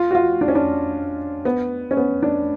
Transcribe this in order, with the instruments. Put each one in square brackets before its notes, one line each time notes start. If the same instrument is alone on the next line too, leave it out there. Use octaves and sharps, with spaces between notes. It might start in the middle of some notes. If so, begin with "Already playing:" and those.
Already playing: [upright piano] F4
F#4
F4
D4
C#4
D4
B3
C#4
B3
D4